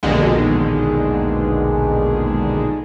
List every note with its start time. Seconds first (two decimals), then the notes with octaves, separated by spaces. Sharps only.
0.03 A#1 D#2 B2 D3 D#3 G#3